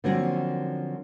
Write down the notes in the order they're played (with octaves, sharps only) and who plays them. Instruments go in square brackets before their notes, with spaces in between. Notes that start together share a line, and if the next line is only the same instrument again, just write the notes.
[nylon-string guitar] D3 F3 F#3 A#3 C4 C#4